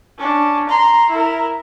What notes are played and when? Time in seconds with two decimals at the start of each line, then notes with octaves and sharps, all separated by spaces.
0.18 C#4 D4
0.69 A#5 C6
1.10 E4 A#4